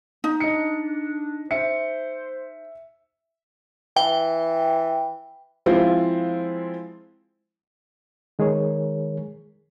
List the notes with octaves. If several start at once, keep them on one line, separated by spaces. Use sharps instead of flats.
D#4
D4 D#5 C#7
C5 E5 C#7
E3 G5
F3 G#3 C4 E4 F4
D#3 G#3 G#4 A#4 C#5